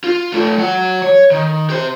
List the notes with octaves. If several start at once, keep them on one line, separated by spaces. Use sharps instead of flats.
F4
A3 F4
F#3 F#5
C#5
D#3
G4 C5